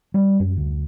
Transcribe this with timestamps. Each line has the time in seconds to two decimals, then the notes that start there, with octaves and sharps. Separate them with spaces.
0.14 G3
0.40 F#2
0.57 D2